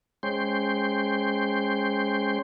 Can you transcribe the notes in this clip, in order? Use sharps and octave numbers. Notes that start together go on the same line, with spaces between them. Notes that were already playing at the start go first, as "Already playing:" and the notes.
G#3 C#4 C5 G5 C6